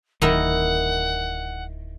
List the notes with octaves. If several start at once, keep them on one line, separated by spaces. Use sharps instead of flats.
D1 D#3 D#4 E4 A#4 F#5